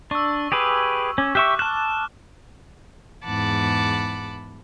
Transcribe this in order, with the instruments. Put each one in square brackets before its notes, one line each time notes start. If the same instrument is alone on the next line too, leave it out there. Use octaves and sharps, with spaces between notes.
[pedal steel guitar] D4 [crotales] C#6 E6
[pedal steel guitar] G4 G#4 B4
[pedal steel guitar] C#4 [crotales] D6
[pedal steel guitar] G4 E5 C#6 [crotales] F#6 E7
[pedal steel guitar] A5 F#6 [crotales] F6 E7
[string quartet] E2 G#2 F#5 A5 B5 D6